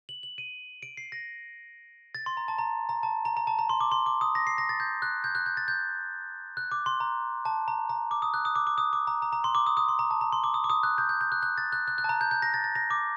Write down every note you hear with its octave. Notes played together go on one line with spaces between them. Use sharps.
F#7
F#7
D#7
D7
C7
A#6
A6
C6
A#5
A5
A#5
A#5
A5
A#5
A#5
A5
A#5
C6
D6
C6
D6
D#6
A#6
C7
A#6
A6
G6
F#6
G6
F#6
G6
A6
G6
F#6
D6
C6
A#5
A5
A#5
A#5
D6
D#6
F#6
D#6
D6
D6
D#6
D6
A#5
A#5
A#5
C6
D6
D#6
D#6
C6
A#5
A5
A#5
C6
D6
D#6
D6
D#6
F#6
G6
G6
G6
F#6
F#6
A6
F#6
F#6
F#6
A5
A#5
G6
G6
A#6
A6
A6
A#6
D6